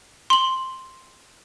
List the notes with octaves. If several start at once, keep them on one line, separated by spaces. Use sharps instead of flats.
C6 F#7